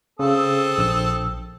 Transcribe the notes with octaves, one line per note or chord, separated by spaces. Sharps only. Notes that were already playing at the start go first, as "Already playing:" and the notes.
C#3 C4 A4 D#6
A#1 E6